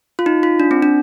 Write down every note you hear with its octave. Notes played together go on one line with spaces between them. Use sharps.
F4
D#4
F4
D4
C4
D4